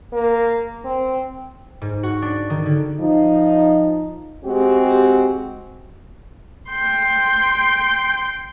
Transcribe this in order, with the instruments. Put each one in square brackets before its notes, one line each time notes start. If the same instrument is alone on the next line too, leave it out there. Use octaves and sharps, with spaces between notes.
[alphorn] A#3
C4
[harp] G#2
F#4
D4
D#3
D3
[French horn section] F3 D#4
G#3 C4 F#4 G4
[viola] G5 C6